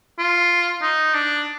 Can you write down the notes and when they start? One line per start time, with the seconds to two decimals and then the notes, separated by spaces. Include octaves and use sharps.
0.19 F4
0.82 D#4
1.14 D4